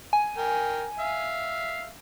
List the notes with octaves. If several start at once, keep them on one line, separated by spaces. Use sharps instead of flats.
G#5
A#4 G5
E5 F5